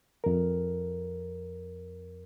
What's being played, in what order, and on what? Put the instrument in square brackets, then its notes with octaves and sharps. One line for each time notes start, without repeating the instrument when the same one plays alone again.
[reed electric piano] F2 A#4